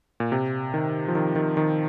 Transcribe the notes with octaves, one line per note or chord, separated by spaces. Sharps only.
A#2
C3
D#3
F3
D#3
D#3
D#3